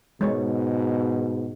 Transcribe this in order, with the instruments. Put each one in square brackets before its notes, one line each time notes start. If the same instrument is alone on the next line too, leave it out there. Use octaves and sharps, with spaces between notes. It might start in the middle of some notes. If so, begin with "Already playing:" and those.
[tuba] G#2 [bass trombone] B2 [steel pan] G#3 C#5